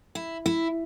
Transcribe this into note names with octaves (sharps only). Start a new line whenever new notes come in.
E4
E4